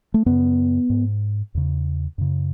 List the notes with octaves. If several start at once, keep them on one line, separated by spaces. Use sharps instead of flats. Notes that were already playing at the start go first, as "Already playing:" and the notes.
A3
F#2 C#3 B3
G#2
E2 C#3
F#2 C#3